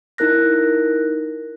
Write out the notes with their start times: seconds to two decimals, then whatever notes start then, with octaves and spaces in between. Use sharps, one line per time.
0.18 D#4 E4 A#4 F#6 A#6